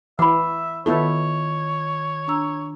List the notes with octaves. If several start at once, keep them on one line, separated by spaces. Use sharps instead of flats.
E3 E5 F#5 B5 D6
D#3 B3 E4 F4 A4 C#5
D4 A#5 E6